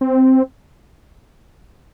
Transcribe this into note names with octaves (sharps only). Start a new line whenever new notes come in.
C4